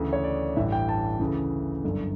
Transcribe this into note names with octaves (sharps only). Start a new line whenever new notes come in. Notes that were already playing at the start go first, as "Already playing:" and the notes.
Already playing: D2 C#3 E3
C#5
D5
A1 G2 E3 E5
G5
A5
D2 C#3 E3
G1 F#2 D3